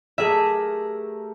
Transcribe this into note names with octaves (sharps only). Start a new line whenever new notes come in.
A3 G4 G#4 A#4 E5